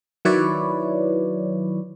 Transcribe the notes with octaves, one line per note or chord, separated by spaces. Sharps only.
D#3 F#3 E4 B4 C#5 D5